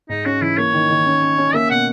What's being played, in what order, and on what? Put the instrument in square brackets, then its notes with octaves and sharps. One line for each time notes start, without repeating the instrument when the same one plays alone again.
[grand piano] G#2 [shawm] D#4
[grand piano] C#4 [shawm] F#4
[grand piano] E3 [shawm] E4
[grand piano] A#3 [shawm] C#5
[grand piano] D#3
D#3
C#4
C#4
C#4
[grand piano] A#3 [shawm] E5
[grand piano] B2 [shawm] F#5